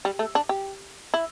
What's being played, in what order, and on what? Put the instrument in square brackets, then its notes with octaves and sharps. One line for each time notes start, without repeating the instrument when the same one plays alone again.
[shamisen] G3
A3
D4
G4
E4